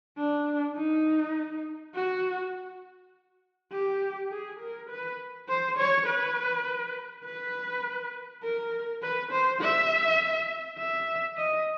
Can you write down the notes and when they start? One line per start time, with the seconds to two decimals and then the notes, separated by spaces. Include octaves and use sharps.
0.18 D4
0.77 D#4
1.95 F#4
3.72 G4
4.31 G#4
4.60 A#4
4.89 B4
5.49 C5
5.78 C#5
6.07 B4
7.25 B4
8.44 A#4
9.02 B4
9.32 C5
9.61 E5
10.78 E5
11.37 D#5